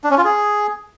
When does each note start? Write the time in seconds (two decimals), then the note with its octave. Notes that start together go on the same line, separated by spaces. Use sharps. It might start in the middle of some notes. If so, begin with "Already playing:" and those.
0.04 D4
0.11 C#4
0.18 F4
0.25 G#4